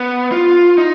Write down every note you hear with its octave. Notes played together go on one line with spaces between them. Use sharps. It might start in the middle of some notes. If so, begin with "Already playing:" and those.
Already playing: B3
F4
D#4